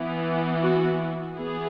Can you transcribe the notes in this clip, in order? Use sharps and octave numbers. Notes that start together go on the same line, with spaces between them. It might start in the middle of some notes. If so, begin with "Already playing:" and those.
Already playing: E3 B3
F#4
E3 B3 G#4